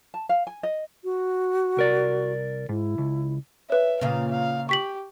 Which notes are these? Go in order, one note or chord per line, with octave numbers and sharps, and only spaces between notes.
A5
F5
G#5
D#5
F#4
C2 A#4 D5
G#2 E4
C#2
B4 C#5 E5
A#2 C#3 F5
F5
G4 C#6 B6 F#7